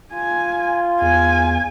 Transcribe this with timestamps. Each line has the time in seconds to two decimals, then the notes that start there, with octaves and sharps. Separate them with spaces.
0.14 F4 G#5
1.01 E2 G#5